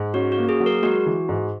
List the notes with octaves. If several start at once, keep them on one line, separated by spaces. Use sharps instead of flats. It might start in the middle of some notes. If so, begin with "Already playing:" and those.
Already playing: G#2
C#4 F#4
F#4
A#3
G#4
F#3
A#4
G#3 F#4
E3
G#2